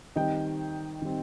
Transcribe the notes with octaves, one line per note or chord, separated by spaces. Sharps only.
D#3 G3 C4 D#5 G5
D#3 G3 C4